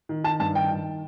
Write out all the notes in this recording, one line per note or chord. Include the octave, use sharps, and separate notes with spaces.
D#3
D#3 A5
G2 A5
D#3 G5
D#3